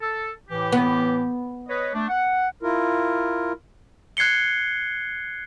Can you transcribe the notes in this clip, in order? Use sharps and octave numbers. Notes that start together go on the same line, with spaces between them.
A4
A2 E3 G4
B3
B4 C#5 D#5
A3 D4
F#5
E4 F4 A#4
F#6 G#6 C7 C#7 G7